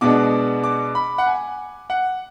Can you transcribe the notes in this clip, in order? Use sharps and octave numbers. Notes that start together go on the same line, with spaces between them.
B2 G#3 B3 D4 D6
D6
B5
F#5
G#5
F#5